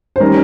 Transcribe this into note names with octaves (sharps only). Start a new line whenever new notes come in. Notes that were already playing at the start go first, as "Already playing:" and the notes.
C5
D#3 G3 C#4 A#4